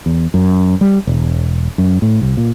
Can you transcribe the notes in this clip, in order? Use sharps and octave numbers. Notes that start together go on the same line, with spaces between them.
E2
F#2
G3
E1
F#2
A2
C2
A#2